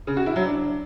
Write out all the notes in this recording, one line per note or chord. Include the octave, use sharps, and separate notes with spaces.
C#3
F#4
E4
F#3
D4